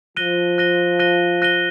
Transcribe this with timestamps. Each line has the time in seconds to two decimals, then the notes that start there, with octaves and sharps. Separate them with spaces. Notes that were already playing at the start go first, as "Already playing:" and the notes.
0.17 F3 F#6 A#6 D#7 G7
0.58 F#6 A#6 D#7 G7
0.99 F#6 A#6 D#7 G7
1.42 F#6 A#6 D#7 G7